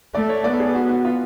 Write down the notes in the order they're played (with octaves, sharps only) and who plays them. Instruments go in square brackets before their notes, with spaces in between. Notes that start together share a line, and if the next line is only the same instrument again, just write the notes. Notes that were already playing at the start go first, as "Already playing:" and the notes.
[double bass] A3 [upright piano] D5
[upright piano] C#5
[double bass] B3 [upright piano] D5
[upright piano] A4
G#4
F#4
F#4
F4